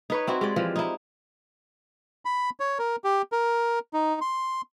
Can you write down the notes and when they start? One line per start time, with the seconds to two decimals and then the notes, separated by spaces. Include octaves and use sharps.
0.10 D#4 B4 C#5
0.27 C4 E4 F#4
0.41 G#3 G4 D5
0.56 E3 F3
0.76 D#4 E4
2.25 B5
2.60 C#5
2.79 A#4
3.04 G4
3.32 A#4
3.93 D#4
4.21 C6